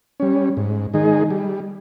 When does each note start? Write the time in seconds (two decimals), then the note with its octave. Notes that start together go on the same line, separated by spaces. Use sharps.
0.20 G3 C#4
0.57 G#2
0.94 D#3 G#3 D#4 G#4
1.30 G3